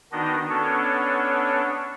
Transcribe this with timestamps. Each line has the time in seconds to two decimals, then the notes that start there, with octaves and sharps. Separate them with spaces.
0.12 D#3 B3 D4 D#4 F#4 D#5
0.50 B3 C#4 D4 A4 C#5